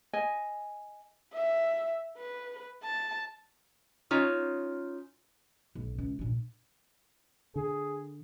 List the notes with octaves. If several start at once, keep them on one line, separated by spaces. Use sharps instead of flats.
D#5 G#5
E5
B4
A5
C#4 D#4 F4 C#5
B1
C#2
A#2 D4
D3 G#4